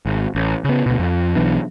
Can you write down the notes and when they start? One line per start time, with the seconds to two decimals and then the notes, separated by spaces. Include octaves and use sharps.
0.06 G#1
0.35 A1
0.64 C#3 B3
0.86 D2 B2
0.99 F2
1.35 B1 E3 B3 D4